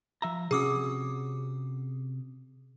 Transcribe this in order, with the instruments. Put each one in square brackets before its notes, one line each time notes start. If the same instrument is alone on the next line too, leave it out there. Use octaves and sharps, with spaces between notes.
[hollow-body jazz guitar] F3 E5 A#5
[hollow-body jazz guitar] C3 C#4 F#4 [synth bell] G#4 D6 D#6